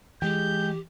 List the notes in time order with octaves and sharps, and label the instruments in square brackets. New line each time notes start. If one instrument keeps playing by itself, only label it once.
[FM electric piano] E3 [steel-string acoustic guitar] G#3 G5 [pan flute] G4 [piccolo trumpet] G6